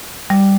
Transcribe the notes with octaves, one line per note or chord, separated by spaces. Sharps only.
G3